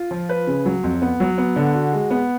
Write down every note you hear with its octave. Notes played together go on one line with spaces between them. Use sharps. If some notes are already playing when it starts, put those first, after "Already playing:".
Already playing: F4
F3
B4
C#3
F#3
F2
B3
F#3
B3
D3
F#4
G#3
B3